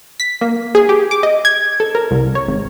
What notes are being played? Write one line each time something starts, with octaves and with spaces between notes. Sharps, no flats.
B6
A#3
G#4
G4
D6
D#5
G#6
A4
A#4
C2
C#5
G#1